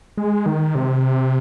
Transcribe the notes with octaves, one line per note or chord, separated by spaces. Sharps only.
G#3
D#3
C3